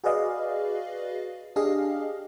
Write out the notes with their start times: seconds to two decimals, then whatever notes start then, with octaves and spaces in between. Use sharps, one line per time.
0.04 F#4 G#4 B4 D5 D#5 F5
1.56 D4 G4 G#4 D#5 F5